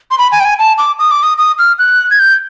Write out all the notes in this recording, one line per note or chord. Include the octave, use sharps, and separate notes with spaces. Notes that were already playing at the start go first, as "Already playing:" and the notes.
C6
B5
G#5
G5
G#5
A5
D6
D#6
D6
D#6
D#6
F6
F#6
G#6
G6